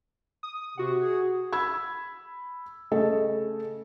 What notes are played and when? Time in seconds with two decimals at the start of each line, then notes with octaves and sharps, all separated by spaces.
0.43 D#6
0.77 C3 F#4 F#5
0.99 G#4
1.53 B5 E6 G#6
2.92 C#3 A3 A4 D#5